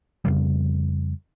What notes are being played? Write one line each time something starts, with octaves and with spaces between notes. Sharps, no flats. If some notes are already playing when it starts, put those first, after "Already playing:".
F2 C#3 G3